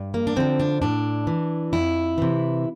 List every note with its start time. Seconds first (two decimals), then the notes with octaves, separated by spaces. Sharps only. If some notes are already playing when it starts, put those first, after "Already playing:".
Already playing: G2
0.14 A#3
0.27 D4
0.36 D3 F3 C4
0.60 D4
0.82 A2 D4
1.27 E3
1.73 F2 E4
2.18 C3 E3